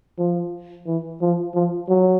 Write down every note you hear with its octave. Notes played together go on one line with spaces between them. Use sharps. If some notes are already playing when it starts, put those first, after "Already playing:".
F3
E3
F3
F3
F#3